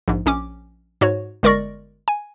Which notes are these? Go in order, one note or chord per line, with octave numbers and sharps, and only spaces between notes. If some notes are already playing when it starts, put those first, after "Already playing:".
A#1 G#2
A#1 C#4 D6
G#2 F#4 C#5
G1 G#3 A#4 D5 C#6 A#6
G#5